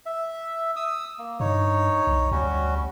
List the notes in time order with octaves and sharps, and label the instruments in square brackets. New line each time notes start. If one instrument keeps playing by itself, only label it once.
[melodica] E5
D#6 E6
A#3
[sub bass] G2 [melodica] D#4 C#5
[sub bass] B1
[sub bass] D2 [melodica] G3 C#4 F#4